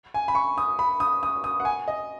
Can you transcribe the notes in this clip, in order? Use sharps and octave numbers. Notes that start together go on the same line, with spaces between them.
G#5
B5
C#6
D#6
B5
D#6
D#6
D#6
F#5
G#5
D#5